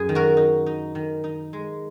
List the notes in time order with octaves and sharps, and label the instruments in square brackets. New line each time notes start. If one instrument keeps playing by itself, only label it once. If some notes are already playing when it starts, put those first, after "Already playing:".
Already playing: [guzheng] F#2 G#4
D#3
F#4 A#4
D#4
D#4
D#3
D#4
G#3